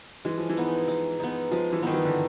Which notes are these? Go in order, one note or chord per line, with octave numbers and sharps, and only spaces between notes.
E3 G#3
F3
E3
B3 D#4
G#3
B3 D#4
F3 G#3
E3
D#3 B3 D#4
E3
D3